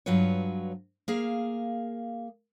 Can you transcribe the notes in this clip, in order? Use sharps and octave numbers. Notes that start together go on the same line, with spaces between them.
G2 F#3 F4 B4 C#5
A#3 G#4 F5